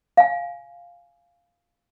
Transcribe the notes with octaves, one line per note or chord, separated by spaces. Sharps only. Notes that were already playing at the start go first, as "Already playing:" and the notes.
F5 G#5